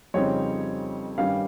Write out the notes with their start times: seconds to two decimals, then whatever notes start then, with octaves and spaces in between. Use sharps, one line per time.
0.14 F2 C#3 G3 C4 D#4 C#5
1.18 G2 D#3 G3 C#4 F5